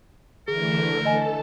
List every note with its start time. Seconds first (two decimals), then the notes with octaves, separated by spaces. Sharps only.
0.48 D3 E3 A3 G#4 A#4
1.05 A4 D#5 G#5 A5